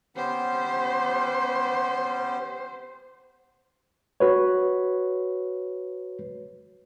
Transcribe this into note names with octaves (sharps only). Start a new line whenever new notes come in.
B3 C#4 G4 C5
F#4 B4 C#5